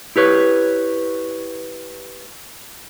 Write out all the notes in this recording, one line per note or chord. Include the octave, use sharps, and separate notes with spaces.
E4 G4 B4 C#5